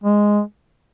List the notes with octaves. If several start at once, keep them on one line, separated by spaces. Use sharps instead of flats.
G#3